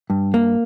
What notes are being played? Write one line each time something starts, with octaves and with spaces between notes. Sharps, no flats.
G2
A#3